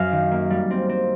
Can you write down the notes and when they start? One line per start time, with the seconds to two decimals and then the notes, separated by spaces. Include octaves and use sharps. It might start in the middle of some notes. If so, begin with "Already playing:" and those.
Already playing: F#2 F5
0.12 D#3
0.32 A#3
0.50 G3
0.71 C4
0.89 C4